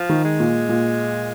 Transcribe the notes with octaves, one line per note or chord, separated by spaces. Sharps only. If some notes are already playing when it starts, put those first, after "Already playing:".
Already playing: F3
D#3
G#3
A#2
A#2